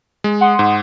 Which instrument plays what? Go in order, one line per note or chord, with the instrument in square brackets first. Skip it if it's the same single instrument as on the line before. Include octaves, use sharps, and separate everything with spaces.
[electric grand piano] G#3
[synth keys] F#5 C6 D#6
[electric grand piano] G#2